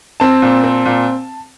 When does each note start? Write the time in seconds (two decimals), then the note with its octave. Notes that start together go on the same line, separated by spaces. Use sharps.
0.20 C4 A5
0.42 A#2
0.64 C4
0.86 A#2